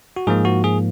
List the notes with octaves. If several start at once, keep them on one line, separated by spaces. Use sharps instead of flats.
F#4
G#2 F3 A#3 G#4
F#4
G#4